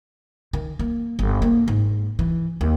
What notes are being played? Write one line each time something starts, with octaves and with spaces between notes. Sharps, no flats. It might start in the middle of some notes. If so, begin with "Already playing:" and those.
D#3
A#3
G1
A#3
G#2
E3
D#2